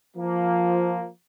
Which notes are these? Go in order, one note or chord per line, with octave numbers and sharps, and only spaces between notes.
F3 A#3